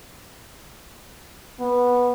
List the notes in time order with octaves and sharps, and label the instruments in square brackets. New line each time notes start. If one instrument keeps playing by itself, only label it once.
[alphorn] B3